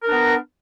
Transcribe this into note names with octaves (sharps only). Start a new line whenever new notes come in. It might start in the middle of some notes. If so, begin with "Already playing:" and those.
B3 D4 A#4